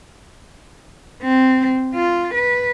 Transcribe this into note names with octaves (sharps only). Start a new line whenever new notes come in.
C4
F4
B4